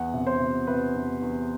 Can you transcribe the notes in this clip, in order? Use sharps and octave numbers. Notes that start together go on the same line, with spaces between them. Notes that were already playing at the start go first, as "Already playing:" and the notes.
Already playing: E2 F#5
C3
C5
C3
C3 B4
E2
E2